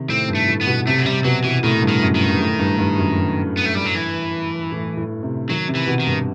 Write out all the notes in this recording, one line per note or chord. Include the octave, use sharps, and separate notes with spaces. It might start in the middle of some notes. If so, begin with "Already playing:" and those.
Already playing: C3 D#3
A2 C4
G2
A3
A2
B3
B2
C3 A3
F#3
C3 G3
B2 F#3
B2 E3
A2 D#3
G2
D#3
F#2
D#3
G2
A2
G2
G2
F#2
G2
B3
A3
G3
F#3
E3
A2
A2
C3
D#3 F#3
C3
E3
B2
D#3
G2